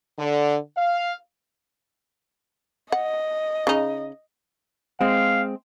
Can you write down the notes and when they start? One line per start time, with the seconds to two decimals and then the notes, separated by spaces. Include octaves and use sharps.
0.19 D3
0.77 F5
2.92 D#5 F#5
3.67 C#3 D#4
5.01 G#3 C4 F5